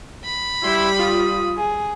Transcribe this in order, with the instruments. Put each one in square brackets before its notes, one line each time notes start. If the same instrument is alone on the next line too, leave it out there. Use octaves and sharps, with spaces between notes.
[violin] B5
[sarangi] G3 [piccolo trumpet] E4 [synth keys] C6 G6
[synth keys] F4 [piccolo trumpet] D#6
[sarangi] G#4